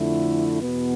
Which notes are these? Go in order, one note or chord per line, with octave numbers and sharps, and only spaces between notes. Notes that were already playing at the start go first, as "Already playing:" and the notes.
Already playing: F2 D3 A3 E4
E2 B2 B3